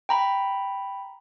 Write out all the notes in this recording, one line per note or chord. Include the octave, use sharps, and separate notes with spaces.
G5 A#5 B5